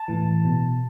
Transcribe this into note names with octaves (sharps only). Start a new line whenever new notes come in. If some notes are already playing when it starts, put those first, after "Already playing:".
Already playing: A5
A2 E3
B2